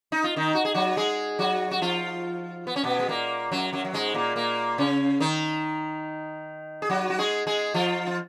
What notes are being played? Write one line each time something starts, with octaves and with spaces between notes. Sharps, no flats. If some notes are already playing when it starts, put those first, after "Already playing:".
D#4
F4
D#3 D#4
F#4
G#4
F#3 F#4
G#3 G#4
F#3 F#4
F#4
F3 F4
B3
C#4
B2 B3
G#3
A#2 A#3
F#2 F#3
F#2 F#3
F#3
G#2 G#3
A#2 A#3
A#2 A#3
C#3 C#4
D#3 D#4
G#4
F#3 F#4
F#4
G#3 G#4
G#3 G#4
F3 F4
F4